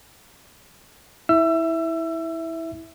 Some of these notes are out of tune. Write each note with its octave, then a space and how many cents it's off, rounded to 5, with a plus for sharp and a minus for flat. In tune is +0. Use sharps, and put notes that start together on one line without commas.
E4 -15 E5 +0 E6 +30